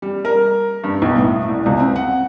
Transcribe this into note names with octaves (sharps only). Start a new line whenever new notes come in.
G3
A#4
G2
B1
A2
C2
C#2
C4
F#5